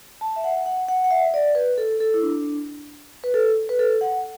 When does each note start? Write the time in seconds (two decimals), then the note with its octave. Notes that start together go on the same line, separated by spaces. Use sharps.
0.21 A5
0.36 E5
0.44 F#5
0.66 F#5
0.89 F#5
1.04 F#5
1.11 E5
1.34 D5
1.55 B4
1.78 A4
2.00 A4
2.14 E4
2.22 D4
3.24 B4
3.34 A4
3.69 B4
3.79 A4
4.01 F#5